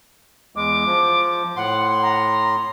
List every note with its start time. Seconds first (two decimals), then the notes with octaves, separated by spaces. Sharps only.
0.56 E2 G#3 D6
0.86 F3
1.56 A2 F#5 C6
2.01 A#5